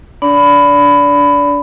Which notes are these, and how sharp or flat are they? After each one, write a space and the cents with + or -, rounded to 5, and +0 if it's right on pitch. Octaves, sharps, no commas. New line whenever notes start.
D4 -20 D5 -25 B5 +15